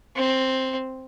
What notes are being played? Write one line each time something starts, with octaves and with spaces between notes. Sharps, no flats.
C4